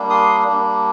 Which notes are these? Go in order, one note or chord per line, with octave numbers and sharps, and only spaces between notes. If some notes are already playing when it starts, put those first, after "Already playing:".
Already playing: G3 A#3 D4
C6 D#6
G3 A#3 D4